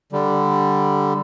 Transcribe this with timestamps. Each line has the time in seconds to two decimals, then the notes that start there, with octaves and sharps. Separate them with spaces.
0.12 D3 G3